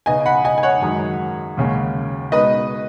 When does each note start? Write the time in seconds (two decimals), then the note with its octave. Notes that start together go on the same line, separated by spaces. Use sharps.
0.06 C#3 B3 D#4 D#5 G#5
0.26 F#5 B5
0.44 D#5 G#5
0.58 G#5
0.63 C#5 F#5
0.82 F#2 D#3 G#3 D#4
1.57 D#2 C#3 G#3 C#4
2.32 B2 G#3 D#4 B4 D#5